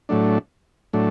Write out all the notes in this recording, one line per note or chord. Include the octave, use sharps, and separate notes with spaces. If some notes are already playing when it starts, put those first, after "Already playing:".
A2 F#3 A3 D4
A2 F#3 A3 D4